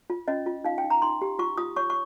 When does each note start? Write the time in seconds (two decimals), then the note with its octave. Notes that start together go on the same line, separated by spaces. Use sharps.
0.10 F4
0.28 C#4 D#5
0.46 F4
0.64 D#4 F5
0.78 G5
0.84 D#4
0.90 A#5
1.02 D#4 C6
1.21 G4
1.39 F4 C#6
1.58 F4 D#6
1.76 C#5 C#6
1.90 C#6